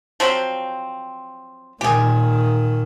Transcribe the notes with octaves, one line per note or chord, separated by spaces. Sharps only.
F3 F#3 C4
A#2 D#3 G4 G#4